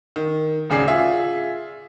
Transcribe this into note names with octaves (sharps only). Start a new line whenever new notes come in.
D#3
D1 C#3 G#4 D5 C7
F4 G#4 E5